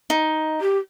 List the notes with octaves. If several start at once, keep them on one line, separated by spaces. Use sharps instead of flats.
D#4
G4